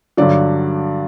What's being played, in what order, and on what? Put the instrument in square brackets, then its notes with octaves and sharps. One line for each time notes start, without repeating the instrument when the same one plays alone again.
[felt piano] G2 D3 F#3 D5